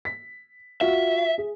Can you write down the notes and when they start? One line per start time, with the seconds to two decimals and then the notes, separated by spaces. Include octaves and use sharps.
0.05 B6
0.81 F4 F#4 E5
1.38 G#4